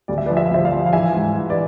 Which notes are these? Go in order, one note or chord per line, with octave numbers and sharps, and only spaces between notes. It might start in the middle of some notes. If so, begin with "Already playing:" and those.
D2 D5
E5
F3 B4 D5
E5
F5
D2 C5 E5
D5 F5
F3
F5
E3 E5 G#5
G#2
E3
B4 D5